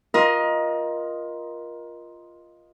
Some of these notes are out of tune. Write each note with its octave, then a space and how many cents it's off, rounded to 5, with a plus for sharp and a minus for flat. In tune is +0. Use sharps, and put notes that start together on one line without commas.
F4 +0 A#4 +25 D#5 +0